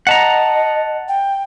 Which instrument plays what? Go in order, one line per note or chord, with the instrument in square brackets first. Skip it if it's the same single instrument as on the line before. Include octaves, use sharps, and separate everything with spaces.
[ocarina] D#5 [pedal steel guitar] F#5 A5 A#5
[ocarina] G5